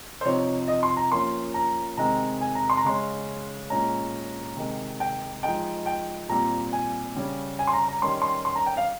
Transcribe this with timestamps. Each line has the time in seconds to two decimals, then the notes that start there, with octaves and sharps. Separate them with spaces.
0.21 C5
0.25 C3 F3 C4 D#4 C#5
0.68 D#5
0.83 C6
0.97 A#5
1.11 F3 A#3 C#4 C6
1.54 A#5
1.97 C3 D#3 G#3 C4 A#5
2.41 G#5
2.55 A#5
2.70 C6
2.77 A#5
2.84 C#3 G#3 C#4 C6
3.70 A#2 G#3 C#4 A#5
4.57 C3 D#3 G#3
5.00 G5
5.43 F3 G#3 D#4 G5
5.86 G5
6.29 A#2 G3 C4 A#5
6.73 G#5
7.16 C#3 G3 C#4
7.59 G#5
7.67 C6
7.73 A#5
7.88 A#5
8.02 D#3 G3 C#4 C6
8.22 C6
8.45 C6
8.55 A#5
8.66 G5
8.77 F5